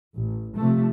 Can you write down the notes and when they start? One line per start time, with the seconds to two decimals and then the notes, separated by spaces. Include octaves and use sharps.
0.16 A1
0.57 C3 F3 A3